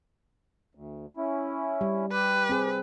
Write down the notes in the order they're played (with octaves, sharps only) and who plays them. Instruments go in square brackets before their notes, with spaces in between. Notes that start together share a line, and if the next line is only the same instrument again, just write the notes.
[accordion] D2
C#4 E4
[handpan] G3
[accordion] G4 [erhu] B4
[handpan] C4 G#4